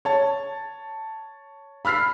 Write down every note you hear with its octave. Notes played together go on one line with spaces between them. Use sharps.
C#5 A5
B5 E6 F6 B6 C7